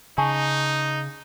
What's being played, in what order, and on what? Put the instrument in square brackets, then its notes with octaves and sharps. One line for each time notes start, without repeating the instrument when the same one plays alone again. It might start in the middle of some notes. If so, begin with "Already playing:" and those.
[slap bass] C#3 [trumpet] D#4 [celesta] G#5 A5 C#6